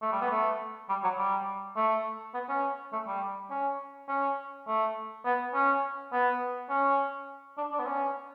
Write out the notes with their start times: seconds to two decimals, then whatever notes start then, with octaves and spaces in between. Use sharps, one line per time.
0.02 A3
0.12 G3
0.21 B3
0.31 A3
0.89 G3
1.04 F#3
1.18 G3
1.76 A3
2.34 B3
2.49 C#4
2.93 A3
3.07 G3
3.50 C#4
4.09 C#4
4.67 A3
5.25 B3
5.54 C#4
6.13 B3
6.70 C#4
7.57 D4
7.72 D4
7.79 B3
7.87 C#4